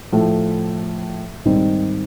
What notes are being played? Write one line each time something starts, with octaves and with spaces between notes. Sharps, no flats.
A2 F3 A3
G#2 D#3 G3 C4 D#4